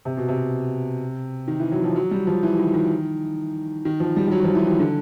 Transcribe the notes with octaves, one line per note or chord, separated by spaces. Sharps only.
C3
B2
C3
D#3
E3
F#3
F3
F#3
G3
F3
E3
D#3
D#3
D#3
F3
G3
G3
F#3
F3
E3
D#3
D3